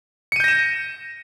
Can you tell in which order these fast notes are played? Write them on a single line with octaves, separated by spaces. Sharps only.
C#7 D#7 G6 A#6 E7